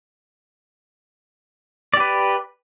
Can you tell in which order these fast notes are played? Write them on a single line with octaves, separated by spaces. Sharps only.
D5 G4 B4